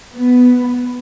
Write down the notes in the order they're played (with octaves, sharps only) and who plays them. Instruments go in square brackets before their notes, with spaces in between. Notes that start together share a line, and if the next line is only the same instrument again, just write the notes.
[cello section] B3